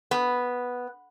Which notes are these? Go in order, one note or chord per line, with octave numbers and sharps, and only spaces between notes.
B3